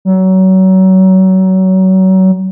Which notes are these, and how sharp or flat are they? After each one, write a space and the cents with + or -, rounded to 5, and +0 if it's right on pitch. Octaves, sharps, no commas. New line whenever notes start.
F#3 +30